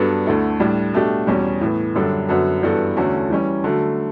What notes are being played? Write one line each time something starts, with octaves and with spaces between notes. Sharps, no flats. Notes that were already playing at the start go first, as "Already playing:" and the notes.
Already playing: G2 F#3 B3 D4 A4
D2 D3 A3 E4 A4
A2 G3 D4
B2 A3 D4 G4
E2 B2 G3 C#4
A2 E3 B3
F#2 D3 G3 D4 A4
F#2 D3 F#3 B3 F#4
G2 E3 B3 F#4 A4
E2 D3 A3 C#4 F#4
E3 G3 C#4
D3 F#3 A3